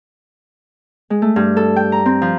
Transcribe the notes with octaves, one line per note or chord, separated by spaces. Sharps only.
G#3
A3
G2
A4
G5
A#5
C4
F3